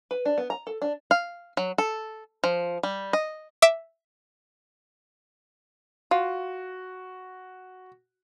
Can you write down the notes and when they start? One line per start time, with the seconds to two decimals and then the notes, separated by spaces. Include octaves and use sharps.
0.11 B4
0.25 D4
0.38 B3
0.50 A#5
0.67 A4
0.82 D4
1.11 F5
1.57 F#3
1.78 A4
2.44 F3
2.83 G3
3.13 D#5
3.62 E5 D6
6.11 F4 F#4